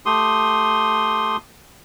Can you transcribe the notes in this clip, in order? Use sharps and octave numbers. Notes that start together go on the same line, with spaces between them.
A3 G4 C6 D#6